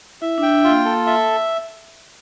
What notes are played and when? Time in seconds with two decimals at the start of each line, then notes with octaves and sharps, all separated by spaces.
0.22 E4 E5
0.38 D4
0.43 G5
0.54 D4
0.64 F4
0.69 A#3
0.85 A4
1.07 E5